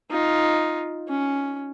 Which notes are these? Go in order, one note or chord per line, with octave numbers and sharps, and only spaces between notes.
D#4 F4
C#4